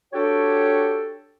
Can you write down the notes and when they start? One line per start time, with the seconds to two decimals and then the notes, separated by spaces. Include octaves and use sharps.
0.13 D4 F#4 G4 A4 C#5 G5